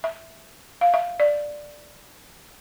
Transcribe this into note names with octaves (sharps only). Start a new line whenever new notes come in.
E5
F5
E5
D5